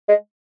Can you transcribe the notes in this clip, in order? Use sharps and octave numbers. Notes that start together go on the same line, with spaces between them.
G#3